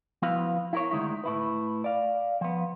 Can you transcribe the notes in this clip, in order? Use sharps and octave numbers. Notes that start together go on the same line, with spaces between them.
F3 B3 E4 F#4 B4 F5
E4 A#4 C#5
D2 B2 D#3 G#3 E4
A2 E4 B4
D5 F5
F3 B3